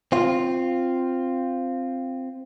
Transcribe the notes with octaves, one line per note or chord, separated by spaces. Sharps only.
C4 F4